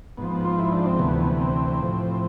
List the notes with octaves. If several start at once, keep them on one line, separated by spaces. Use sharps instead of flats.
G#2 F3 B3
B3
F4
E4
D4
C4
D2 C3 E3 B3
C4
A2 F3